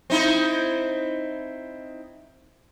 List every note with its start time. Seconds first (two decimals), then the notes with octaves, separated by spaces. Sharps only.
0.10 C4 D#4 E4